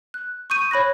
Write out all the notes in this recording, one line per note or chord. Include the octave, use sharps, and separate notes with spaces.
F#6
C#6 D#6 G6 D#7
C#5 B5 F#6 A#6